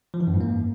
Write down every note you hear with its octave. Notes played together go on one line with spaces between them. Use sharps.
F3
E3
F#2
G#2
A#3